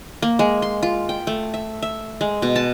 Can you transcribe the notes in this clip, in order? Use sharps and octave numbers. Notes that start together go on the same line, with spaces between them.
A#3
G#3
C6
F4
G5
A3
E5
E5
G#3
B2
A5